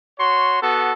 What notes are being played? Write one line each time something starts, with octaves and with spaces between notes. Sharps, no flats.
F#4 C#5 C6
B3 F#4 A4